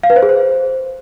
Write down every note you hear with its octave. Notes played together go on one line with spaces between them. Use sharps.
F5
B4
C5
G#4
C5